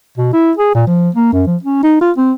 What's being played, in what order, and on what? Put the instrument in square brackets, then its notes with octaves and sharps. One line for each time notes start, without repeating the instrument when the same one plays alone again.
[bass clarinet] B2
E4
G#4
A#2
F3
A#3
F#2
F3
C#4
D#4
F4
C4